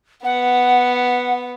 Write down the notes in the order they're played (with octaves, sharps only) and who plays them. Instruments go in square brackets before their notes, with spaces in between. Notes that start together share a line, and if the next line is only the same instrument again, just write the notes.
[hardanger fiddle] B3 [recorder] F#5